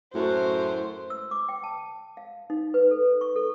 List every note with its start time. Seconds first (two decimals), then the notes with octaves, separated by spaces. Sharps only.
0.15 F#2 A2 F#4 C5
1.10 E6
1.31 D6
1.49 G5
1.64 A5
2.17 F5
2.50 D#4
2.74 B4
2.91 A4
3.21 C#6
3.36 A4